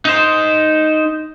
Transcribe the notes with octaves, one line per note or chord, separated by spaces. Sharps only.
D#4 C5